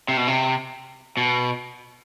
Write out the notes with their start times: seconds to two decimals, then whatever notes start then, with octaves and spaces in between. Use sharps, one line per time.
0.08 C3
0.17 B2
0.27 C3
1.17 B2